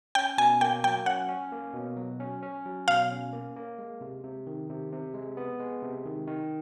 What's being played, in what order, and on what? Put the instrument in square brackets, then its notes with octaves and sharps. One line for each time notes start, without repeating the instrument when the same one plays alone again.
[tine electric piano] C#4 [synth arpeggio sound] G5
[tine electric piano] B2 [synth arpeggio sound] G#5
[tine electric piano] A#3 [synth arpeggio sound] G5
[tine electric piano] F#3 [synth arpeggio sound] G5
[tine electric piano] C#4 [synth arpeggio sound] F#5
[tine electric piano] C#4
A#3
B2
F#3
C#4
C#4
F#3
[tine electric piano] B2 [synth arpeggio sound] F5
[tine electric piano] C#4
A#3
A#3
G#3
C3
C3
D#3
C3
C3
G#3
B3
G#3
C3
D#3
D#3